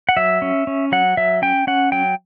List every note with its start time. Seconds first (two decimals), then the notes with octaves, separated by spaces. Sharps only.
0.09 F#5
0.17 F#3 E5
0.42 C#4
0.67 C#4
0.92 F#3 F#5
1.17 F#3 E5
1.42 C#4 G5
1.67 C#4 F#5
1.92 F#3 G5